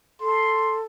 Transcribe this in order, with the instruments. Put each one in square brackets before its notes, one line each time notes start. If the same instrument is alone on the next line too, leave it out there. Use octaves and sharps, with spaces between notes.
[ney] A4 [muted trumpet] C6